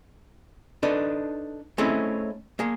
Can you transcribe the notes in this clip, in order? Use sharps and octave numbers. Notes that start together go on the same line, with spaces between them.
D4 D#4 A4 B4
A3 C4 C#4 D#4 E4 G#4
A#3 G#4